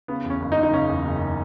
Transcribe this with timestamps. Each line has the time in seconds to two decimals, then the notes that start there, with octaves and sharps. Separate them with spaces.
0.08 C#3 B3
0.25 E2
0.30 C#4
0.41 F#1
0.52 D#4
0.57 F#1
0.63 D#4
0.73 C#3 C#4
0.89 E2
1.05 F#1